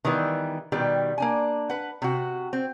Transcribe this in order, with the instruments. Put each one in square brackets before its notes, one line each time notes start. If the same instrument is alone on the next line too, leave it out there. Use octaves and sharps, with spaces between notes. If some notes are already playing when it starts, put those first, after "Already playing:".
[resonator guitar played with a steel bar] D#3 E3 G3 B3
B2 D#3 G3 G4
A#3 D4 G#5
B4 F#5
C3 F#4
C4